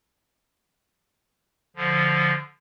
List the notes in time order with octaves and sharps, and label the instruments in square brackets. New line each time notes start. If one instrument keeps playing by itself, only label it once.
[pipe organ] D3 F3